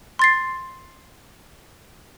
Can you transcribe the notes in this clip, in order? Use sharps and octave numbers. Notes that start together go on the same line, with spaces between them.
C6 A6 C7